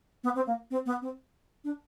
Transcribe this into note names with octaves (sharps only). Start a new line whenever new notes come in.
B3
C4
A#3
C4
B3
C4
D4